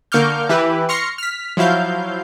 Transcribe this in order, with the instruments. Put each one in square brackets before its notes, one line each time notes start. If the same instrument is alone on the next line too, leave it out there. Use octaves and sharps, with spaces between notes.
[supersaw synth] D3 A#3 C#6 D6 F6 G6
E3 E4 G4 B4
C6 C#6 F6 A#6 C7 C#7
F6 B6
F3 F#3 E4 F5 G6